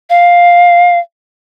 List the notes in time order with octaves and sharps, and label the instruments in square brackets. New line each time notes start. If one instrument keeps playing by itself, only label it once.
[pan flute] F5